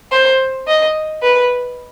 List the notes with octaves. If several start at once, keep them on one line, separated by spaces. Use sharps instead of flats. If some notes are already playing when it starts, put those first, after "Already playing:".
C5
D#5
B4